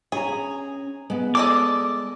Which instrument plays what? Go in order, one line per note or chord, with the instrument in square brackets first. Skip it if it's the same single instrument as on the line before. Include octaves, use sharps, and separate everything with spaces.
[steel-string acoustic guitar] C#4 A#5 [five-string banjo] G#4
[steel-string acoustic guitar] G#3 B3
[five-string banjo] A4 D5 D#5 [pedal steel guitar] D6